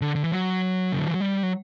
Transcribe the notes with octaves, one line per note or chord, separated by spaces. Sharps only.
D3
D3
E3
F#3
C#3
D3
E3
F#3
G3
F#3